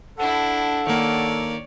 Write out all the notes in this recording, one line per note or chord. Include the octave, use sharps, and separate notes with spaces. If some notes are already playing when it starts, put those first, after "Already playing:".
D4 E4 A4 F#5
D#3 A#3 C#5 D5